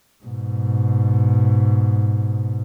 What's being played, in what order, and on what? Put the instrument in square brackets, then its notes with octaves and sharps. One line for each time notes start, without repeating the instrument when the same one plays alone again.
[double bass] G#2 B2